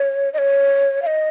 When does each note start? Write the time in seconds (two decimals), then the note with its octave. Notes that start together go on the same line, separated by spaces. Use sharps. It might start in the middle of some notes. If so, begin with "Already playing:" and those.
Already playing: C#5
0.34 D#5
0.38 C#5
1.02 F5
1.07 D#5